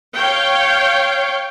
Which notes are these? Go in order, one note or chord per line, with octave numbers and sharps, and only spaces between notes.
C#5 F5 G5